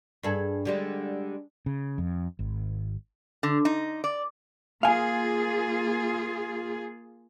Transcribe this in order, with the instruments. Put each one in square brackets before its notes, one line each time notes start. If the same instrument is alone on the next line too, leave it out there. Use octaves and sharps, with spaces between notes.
[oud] G2 G#4 A4
D3 G3 G#3
[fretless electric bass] C#3
F2
G#1
[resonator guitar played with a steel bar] D3
D#4
D5
[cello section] A#3 F4 G#4 [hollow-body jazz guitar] F5 G#5